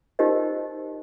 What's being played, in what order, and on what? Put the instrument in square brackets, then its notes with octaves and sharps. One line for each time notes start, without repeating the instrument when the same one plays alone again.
[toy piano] D#4 F4 G4 A#4 C5 D#5